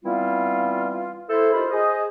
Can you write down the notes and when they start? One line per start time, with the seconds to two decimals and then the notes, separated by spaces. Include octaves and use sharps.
0.05 E3 G3 B3 C4 E4 F4
1.29 E4 A4 C5
1.54 D#4 F4 G4 A#4 C5 B5
1.71 G#4 C5 D#5